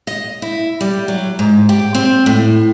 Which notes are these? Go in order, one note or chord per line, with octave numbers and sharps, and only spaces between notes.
D#5
E4
G3
F#3
G#2
G4
C4
A2